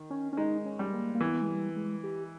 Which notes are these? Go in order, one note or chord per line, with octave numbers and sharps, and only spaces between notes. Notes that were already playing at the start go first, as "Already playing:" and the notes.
Already playing: D#3
C#4
C#4
G#3 D#4
C#4
G3
A#3
A#3
E3 B3
G#3
G3
G#3
G4